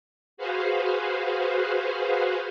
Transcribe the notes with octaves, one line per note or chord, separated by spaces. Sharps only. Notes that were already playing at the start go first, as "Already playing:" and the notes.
F#4 G#4 B4 C5 F5